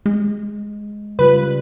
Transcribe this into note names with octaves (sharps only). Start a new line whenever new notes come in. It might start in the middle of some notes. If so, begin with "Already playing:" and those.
G#3
C#3 G3 F4 B4